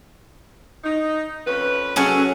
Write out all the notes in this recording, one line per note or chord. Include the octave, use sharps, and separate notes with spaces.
D#4
F2 C#4 B4
F#3 C#4 G#4 A4